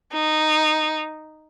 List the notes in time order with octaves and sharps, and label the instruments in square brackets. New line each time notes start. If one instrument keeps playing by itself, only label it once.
[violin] D#4